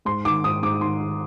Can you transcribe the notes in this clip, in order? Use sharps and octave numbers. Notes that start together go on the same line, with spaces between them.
G#2 C6
D#3 D6
G#2 D#6
G#2 D6
D#3 C6
D#3